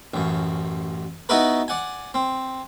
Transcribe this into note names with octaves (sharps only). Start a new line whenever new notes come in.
A1 F#2
B3 D#4 E4 F#4 A#4 B4
D5 F#5 G#5
C4